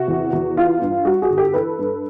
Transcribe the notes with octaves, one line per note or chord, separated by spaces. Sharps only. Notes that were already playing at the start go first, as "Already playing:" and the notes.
Already playing: C3 F#4
E2
E2
E3 F4
G2
G3 F#4
F#4 G#4
G1
G4 A4
E3 A4 B4
G2